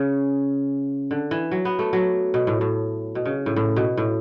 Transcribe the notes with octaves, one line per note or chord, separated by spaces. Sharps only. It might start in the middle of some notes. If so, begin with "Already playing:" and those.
Already playing: C#3
D3
E3
F#3
B3
A3
F#3
B2
A2
A2
B2
C#3
A2
A2
B2
A2